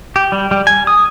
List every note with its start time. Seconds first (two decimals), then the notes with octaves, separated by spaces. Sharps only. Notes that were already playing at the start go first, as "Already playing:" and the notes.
0.16 G4
0.32 G3
0.51 G3
0.67 G#5
0.87 D#6